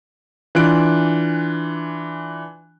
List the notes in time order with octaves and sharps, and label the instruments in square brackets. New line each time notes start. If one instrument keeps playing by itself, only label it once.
[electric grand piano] E3 D4 F4 F#6 D7